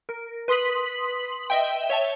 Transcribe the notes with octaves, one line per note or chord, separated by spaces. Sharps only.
A#4
B4 C6 D#6 B6 F#7
D#5 E5 G5
C#5 E5 A5